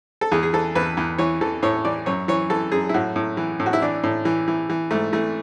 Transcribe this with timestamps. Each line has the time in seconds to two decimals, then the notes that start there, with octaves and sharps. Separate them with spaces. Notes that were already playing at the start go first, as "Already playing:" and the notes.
0.21 A4
0.32 E2 G#4
0.43 G#4
0.53 E3 A4
0.75 E2 B4
0.97 E2
1.18 E3 C#5
1.41 E3 A4
1.63 A2 C#5
1.85 E3 D5
2.06 F#2 C#5
2.28 E3 C#5
2.50 E3 A4
2.72 F#2 G#4
2.89 E4
2.94 A2 F#4
3.16 A2
3.37 E3
3.60 A2
3.66 F#4
3.73 E4
3.82 E3 D4
4.04 A2
4.25 E3
4.48 E3
4.70 E3
4.91 G#2 A3
5.13 E3 A3